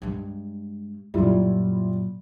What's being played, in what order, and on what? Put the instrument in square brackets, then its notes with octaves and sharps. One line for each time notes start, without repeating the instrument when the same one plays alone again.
[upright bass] G2 G#3
[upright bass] F#2 A#2 [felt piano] G3 E4 F4